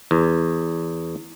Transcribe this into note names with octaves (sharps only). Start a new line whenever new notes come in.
E2